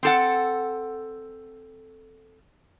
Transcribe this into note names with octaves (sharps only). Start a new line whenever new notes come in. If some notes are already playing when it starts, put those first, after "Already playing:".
C4 A4 F#5